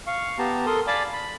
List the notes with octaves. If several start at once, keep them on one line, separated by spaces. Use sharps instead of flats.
F5 C#6
B3 G4 A5 A#5
A4 A#4 C6 D#6
D5 F5 G#5 A5 B5 D6
B5